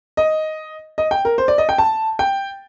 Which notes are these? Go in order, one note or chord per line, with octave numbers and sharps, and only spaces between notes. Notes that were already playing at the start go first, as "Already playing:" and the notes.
D#5
D#5
G5
A#4
C5
D5
D#5
G5
A5
G5